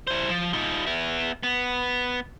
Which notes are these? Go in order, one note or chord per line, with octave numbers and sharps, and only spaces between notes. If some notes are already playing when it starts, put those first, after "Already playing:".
E4 C5
F3
D#4 F4
B3 E5
B3